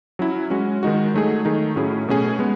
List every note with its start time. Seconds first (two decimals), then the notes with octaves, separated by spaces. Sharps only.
0.19 F#3 C#4 E4
0.50 G#3 C#4 F#4
0.83 D#3 G#3 D#4 F#4
1.14 F#3 A3 D#4 G#4
1.45 D#3 A3 D#4 G#4
1.76 A2 F#3 C#4 E4 G#4
2.08 B2 A3 C#4 G#4
2.39 G#3 B3